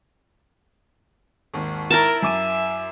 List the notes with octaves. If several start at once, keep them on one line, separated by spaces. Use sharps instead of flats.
G#1 D#2
E4 A#4 A5 A#5
F#2 E5 D6 D#7